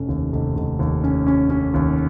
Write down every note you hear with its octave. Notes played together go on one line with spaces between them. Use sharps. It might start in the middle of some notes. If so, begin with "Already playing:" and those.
Already playing: F1 C#4
D#2
F1
F1
D#2
C#4
C#4
C#4
D#2